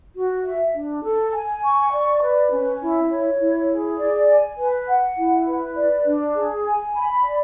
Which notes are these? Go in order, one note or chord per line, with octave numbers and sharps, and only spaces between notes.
F#4
E5
D4
A4
G#5
C#6
D5
B4
C#4
E4
C#5
E4
G#4
D5
G#5
B4
F#5
E4
B4
D5
D4
G#4
G#5
B5
D5